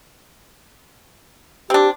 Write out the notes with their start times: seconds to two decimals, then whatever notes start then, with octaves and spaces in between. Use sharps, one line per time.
1.70 C4 D4 G4